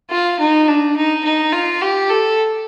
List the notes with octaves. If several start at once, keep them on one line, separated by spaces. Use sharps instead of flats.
F4
D#4
D4
D#4
D#4
F4
G4
A4